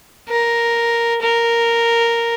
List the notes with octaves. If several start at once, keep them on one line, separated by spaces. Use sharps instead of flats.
A#4
A#4